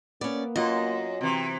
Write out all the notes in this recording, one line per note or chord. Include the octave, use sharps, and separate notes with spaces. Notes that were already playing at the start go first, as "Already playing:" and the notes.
A#3 B3 C#4 D5
F#2 F#3 F4 F#4 D#5
C3 E3